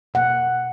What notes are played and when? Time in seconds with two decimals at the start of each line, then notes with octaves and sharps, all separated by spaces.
0.14 B2 A#3 F#5